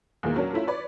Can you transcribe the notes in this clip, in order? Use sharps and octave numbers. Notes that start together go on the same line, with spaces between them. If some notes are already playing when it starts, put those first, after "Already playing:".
E2 A#2 D#3 G#3 A#3
F#3 C#4 D4 A#4
A3 C#4 E4 F4
B4 C#5 D5 B5